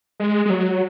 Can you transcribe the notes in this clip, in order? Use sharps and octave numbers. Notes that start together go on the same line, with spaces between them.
G#3
G#3
F#3